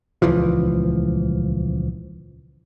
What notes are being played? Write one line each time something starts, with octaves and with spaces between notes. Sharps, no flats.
D#1 C#2 E3 F3